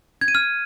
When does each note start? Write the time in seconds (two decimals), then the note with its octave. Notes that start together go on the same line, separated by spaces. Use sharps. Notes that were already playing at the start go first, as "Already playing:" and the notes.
0.21 G#6
0.28 D#7
0.35 F6